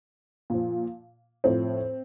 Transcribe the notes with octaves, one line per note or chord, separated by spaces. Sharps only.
A#2 F3
A2 F3 C4